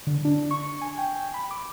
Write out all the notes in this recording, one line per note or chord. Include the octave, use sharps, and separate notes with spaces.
D3
D4
C#6
G#5
G5
B5
D6